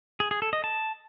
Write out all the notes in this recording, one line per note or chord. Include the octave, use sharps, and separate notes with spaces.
G#4
G#4
A4
D#5
A5